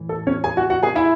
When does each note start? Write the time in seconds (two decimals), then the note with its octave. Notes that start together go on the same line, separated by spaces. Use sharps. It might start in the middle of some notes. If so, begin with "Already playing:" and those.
Already playing: A2 E3
0.09 A4
0.27 C#4 C#5
0.44 G#4 G#5
0.57 F#4 F#5
0.70 F#4 F#5
0.83 G#4 G#5
0.95 E4 E5